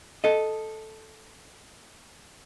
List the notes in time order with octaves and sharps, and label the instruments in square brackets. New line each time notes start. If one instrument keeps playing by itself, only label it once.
[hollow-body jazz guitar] A4 D#5